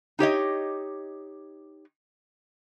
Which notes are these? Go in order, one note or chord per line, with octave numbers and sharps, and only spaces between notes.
D#4 G4 C#5 D#5